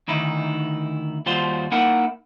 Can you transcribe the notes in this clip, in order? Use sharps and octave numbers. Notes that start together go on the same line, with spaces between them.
D2 D#3 D#4 E4
D#2 G3 F4 F#4 C5 C6
A#3 D#4 E4 A#4 F#5